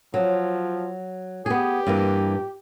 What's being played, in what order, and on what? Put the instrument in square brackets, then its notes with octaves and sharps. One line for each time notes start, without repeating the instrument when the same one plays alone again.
[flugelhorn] F3 [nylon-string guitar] F#3
[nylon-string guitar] B3 G#4 [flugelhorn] G4
[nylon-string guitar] G2 E3 A#3